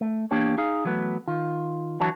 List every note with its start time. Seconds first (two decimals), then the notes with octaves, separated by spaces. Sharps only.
0.01 A3
0.31 E2 A#3 D4 G4 C#5
0.58 D#4 G#4 F5
0.85 E3 F#3 A3 B3
1.28 D#3 F4
2.00 D3 E3 F#3 E4 F#4 A5